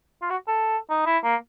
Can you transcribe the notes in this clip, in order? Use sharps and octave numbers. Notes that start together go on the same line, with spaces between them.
F4
F#4
A4
D#4
E4
A#3